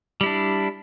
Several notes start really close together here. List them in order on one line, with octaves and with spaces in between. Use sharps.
G3 E4 D4